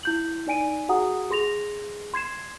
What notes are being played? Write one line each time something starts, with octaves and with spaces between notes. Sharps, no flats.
E4 G6 F#7
D#4 D5 G#5 D7 D#7
F#4 G#4 F#5 A#5 D#6
G#4 C6 A#6 F7
C6 G#6 C7 E7